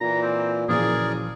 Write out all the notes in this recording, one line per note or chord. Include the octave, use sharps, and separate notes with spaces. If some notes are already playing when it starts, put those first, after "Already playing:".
A#2 E3 A#5
C4
F#1 A#2 E3 F3 G#4 A#4 D5